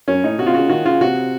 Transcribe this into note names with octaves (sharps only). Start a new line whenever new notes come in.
F#2 C#4
A2 D#4
C3 F#4
F4
C#3 F#4
D#3 F#4
C#3 F4
C3 F#4